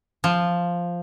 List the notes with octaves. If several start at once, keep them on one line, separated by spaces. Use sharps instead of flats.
F3